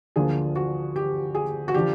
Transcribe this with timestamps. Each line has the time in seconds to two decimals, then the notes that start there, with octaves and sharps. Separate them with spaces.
0.16 D2 D3 F3 A#3 D4 G#4
0.56 F#4
0.96 G4
1.35 G#4
1.68 F#4
1.74 D3 F3 G4